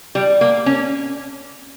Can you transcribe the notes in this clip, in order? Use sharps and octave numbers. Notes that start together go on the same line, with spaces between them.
G3
A#3
C#4